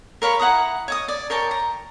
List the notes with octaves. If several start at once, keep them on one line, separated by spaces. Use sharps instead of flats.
A#4 C#5 F5 B5
E4 F#5 A#5 D#6
C#5 D#5 D#6
D5
A#4 C#5 G5 A5
A#5